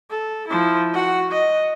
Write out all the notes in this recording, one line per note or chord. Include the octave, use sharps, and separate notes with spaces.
A4
F3 E4
F#4 F#5
D#5